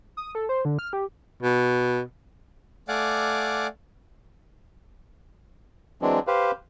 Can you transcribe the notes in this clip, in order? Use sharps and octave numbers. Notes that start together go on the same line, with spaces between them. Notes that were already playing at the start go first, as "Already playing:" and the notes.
D#6
A4
C5
D3
F6
G4
B2
A3 D5 F5 F#5 G#5 D6
E3 F#3 G#3 C4 D4
G4 B4 C5 F5